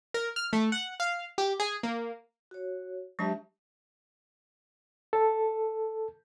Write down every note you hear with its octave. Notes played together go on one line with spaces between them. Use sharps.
A#4
F6
A3
F#5
F5
G4
G#4
A#3
F#4 C#5
F#3 G#3 D4 G4 E5 A5
A4